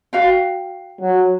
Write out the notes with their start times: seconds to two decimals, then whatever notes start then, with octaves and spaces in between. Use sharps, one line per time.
0.13 F#4 F5 G5
1.01 F#3